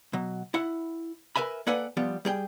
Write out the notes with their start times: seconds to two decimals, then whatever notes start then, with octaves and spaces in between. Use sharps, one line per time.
0.13 B2 F#3
0.54 E4 F#5
1.36 A#4 B4 E5 G#5 B5
1.67 A#3 A4 B4 D5 F#5 G#5
1.97 F3 G3 B3
2.25 G3 G#4 G5